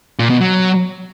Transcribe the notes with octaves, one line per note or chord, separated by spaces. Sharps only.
A#2
B2
F#3